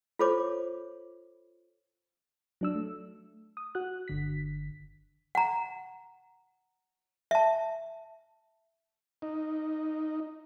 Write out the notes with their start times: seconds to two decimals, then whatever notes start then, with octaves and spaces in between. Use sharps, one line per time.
0.19 F4 A4 C5 C#5 D6
2.61 F#3 D4 E6
2.75 A3
3.57 D#6
3.75 F#4 F#6
4.08 G1 D3 B6
5.35 F#5 A#5
7.31 E5 A5
9.22 D#4